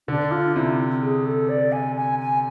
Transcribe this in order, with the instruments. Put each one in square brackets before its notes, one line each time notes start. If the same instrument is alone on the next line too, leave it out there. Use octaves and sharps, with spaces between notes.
[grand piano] D3 [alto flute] D4
[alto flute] F4
[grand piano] C3 [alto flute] E4
[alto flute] G#4
A4
D5
G#5
G#5
G#5